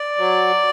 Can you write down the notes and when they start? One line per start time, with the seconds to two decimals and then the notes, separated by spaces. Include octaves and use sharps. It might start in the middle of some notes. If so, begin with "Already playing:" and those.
Already playing: D5
0.18 F#3